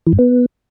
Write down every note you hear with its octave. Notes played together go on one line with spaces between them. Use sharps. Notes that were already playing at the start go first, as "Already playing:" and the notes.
E3
G2
B3